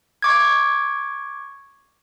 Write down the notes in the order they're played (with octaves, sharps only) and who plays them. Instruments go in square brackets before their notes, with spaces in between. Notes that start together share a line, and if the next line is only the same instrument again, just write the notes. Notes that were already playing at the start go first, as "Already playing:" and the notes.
[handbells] C#6 D6 G#6